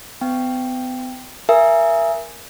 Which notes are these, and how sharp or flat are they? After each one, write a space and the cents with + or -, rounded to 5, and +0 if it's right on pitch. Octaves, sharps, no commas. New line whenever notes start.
B3 +40 G5 +0
A#4 +10 E5 +25 G#5 +0